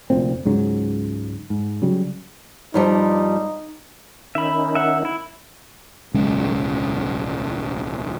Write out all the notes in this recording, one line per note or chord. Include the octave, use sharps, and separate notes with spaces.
F1 D2 A#2 C4
C#2 G#2 C#3 F#3
G#2
C#3 F#3 G3
G2 F3 G3 D#4
D#3 C#4 D#4 E5 B5
E5 F#5
E4
D1 B1 C#3 G#3